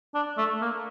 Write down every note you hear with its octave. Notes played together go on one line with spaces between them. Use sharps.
D4
A3
A#3